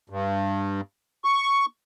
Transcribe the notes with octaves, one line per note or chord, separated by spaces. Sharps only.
G2
C#6